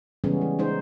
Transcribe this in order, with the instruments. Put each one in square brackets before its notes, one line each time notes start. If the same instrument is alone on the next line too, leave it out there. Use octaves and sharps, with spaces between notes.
[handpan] C#3 E3 G3 G#3 B3 C#4
G#3
G#3 D#4 C5